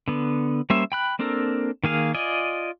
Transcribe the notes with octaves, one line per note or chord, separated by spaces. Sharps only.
D3 B3
G3 A#3 C#4 C5 E5
G5 B5 F#6
A#3 C4 D4 A4 A#4
D#3 A#3 G#4 F5
F4 D5 D#5 G#5